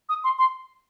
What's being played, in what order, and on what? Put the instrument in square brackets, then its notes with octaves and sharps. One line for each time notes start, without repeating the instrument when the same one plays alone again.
[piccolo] D#6
C6
C6